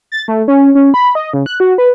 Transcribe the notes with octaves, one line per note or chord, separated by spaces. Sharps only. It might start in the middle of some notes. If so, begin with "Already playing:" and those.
A6
A3
C#4
C#4
B5
D#5
C#3
F#6
F#4
B4